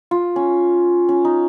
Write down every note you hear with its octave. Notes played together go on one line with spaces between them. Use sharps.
F4
C#4
C#4
D#4